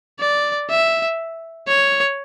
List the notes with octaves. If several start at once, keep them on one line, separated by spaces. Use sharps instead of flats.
D5
E5
C#5